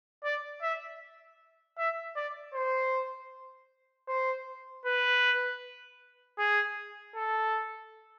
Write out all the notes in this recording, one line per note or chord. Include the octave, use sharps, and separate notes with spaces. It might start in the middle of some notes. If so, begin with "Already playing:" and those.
D5
E5
E5
D5
C5
C5
B4
G#4
A4